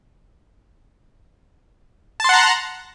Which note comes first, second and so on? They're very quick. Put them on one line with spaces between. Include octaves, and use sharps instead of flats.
A5 C6 F#5 A#5